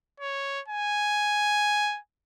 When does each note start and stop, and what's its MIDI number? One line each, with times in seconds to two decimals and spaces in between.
0.20 0.61 73
0.68 1.99 80